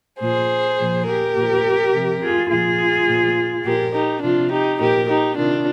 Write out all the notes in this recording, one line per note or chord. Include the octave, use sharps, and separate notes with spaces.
A#2 F3 G#4 C5
A#2 F3
G4 A#4
A#2 F3
C3 F3
F4 G#4
A#2 F3 F4 G#4
A#2 F3
A#2 F3 G4 A#4
D#4 G4
C3 F3 D4 F4
D#4 G4
A#2 F3 G4 A#4
D#4 G4
C3 D#3 D4 F4